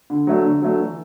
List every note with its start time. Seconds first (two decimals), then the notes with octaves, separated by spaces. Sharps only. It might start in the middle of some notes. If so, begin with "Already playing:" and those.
0.10 D3
0.27 F#3 A3 D4
0.45 D3
0.62 F#3 A3 D4
0.80 E3